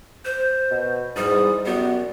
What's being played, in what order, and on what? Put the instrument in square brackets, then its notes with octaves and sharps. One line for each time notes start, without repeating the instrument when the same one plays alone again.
[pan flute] C5
[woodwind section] B2
[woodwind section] E2 G#2 D#6 [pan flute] G3
[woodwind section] F#2 G3 [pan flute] B3